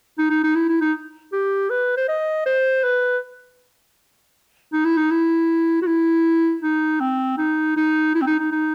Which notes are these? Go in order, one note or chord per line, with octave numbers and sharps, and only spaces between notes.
D#4
D#4
D#4
E4
E4
D#4
G4
B4
C5
D#5
C5
B4
D#4
E4
D#4
E4
F#4
E4
D#4
C4
D#4
D#4
E4
C4
D#4
D#4
D#4